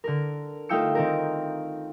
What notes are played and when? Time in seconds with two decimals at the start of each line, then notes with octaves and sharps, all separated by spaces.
0.04 D3 A#4
0.69 A3 D#4 F4 G5 E6 C#7
0.95 D#3 C4 A#4